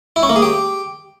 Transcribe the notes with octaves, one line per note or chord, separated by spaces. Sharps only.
E4
C#4
A#3
G#4
G4